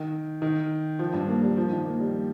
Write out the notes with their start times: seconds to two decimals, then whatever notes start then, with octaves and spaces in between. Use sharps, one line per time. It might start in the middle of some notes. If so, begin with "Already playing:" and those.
Already playing: D#3
0.42 D#3
0.99 F3
1.13 G2
1.28 A#3
1.42 G3
1.57 F3
1.71 D#3
1.85 A#3
2.00 G3